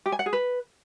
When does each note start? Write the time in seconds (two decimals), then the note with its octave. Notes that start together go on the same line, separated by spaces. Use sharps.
0.06 G4
0.12 G#5
0.19 F#5
0.26 G#4
0.33 B4